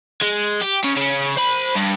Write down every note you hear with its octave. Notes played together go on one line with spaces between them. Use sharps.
G#3
G4
C#3
C#3 C#4
C5 B5
G2